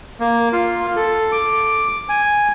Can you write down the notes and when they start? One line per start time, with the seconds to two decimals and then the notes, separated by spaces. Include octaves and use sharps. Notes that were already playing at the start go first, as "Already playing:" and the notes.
0.20 A#3
0.52 F4
0.96 A4
1.32 D6
2.09 G#5